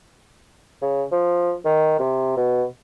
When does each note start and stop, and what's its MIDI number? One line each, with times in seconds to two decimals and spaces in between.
0.82 1.04 49
1.12 1.54 53
1.65 1.98 51
1.99 2.33 48
2.37 2.64 47